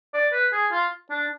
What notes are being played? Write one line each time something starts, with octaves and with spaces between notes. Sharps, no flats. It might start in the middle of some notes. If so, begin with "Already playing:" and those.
D5
B4
G#4
F4
D4